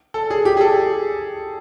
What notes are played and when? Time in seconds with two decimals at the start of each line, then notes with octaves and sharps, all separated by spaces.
0.14 A4
0.30 G#4
0.45 G4
0.57 G#4
0.61 A4